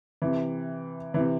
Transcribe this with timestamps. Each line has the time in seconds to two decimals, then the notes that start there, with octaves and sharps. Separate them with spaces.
0.22 C3 E3
1.14 C3 E3